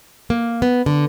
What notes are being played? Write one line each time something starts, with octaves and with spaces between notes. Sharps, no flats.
A#3
B3
D3